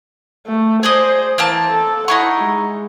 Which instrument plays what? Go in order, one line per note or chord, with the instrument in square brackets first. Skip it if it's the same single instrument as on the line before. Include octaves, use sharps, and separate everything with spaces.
[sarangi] A3
[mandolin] G#4 D5 D#5 [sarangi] C5
[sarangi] E3 [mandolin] A#3 C4 A5
[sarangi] A4
[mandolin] D#4 E4 C#6 [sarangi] F#5
[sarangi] G#3